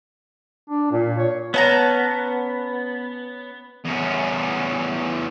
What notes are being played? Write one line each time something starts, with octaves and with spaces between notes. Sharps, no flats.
D4
A#2
C#5
B3 C#4 A5 A#5
E2 C#4